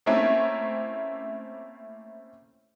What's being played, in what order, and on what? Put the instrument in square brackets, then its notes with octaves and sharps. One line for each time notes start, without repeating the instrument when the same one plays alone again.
[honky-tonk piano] A3 A#3 C4 C#4 E4